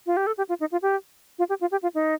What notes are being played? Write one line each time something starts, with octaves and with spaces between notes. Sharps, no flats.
F4
G4
A4
G4
F4
D#4
F4
G4
F4
G4
F4
G4
F4
D#4